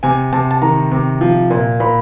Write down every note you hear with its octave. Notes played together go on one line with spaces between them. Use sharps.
C3 G#5
C3 A5
A5
D#3 A#5
C3
F3
A#2
A#2 B5